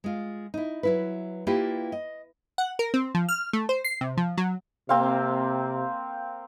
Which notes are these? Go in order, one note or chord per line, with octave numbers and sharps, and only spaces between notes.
G#3 F4
D#4 E4
F#3 E4 B4
A#3 E4 F4 G4 B4 D5
D#5
F#5
A#4
C4
F3
F6
A3
C5
C7
C3
F3
F#3
C3 A#3 C4 F5